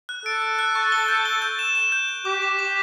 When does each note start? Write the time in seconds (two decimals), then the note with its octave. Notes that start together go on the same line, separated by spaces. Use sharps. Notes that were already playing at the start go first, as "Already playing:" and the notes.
0.09 F#6
0.26 A4 D7
0.42 F#6
0.59 F#6
0.75 C#6
0.92 G7
1.09 G6
1.25 G7
1.42 G6
1.59 E7
1.75 E7
1.92 G6
2.09 G6
2.25 G4 D6
2.42 D6
2.59 D6